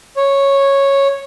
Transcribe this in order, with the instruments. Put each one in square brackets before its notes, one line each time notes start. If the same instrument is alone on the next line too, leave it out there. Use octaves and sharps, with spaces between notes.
[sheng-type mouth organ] C#5